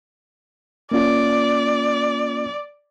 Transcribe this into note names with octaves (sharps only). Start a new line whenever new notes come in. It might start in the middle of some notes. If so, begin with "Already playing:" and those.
A#3 C#4 F4 D5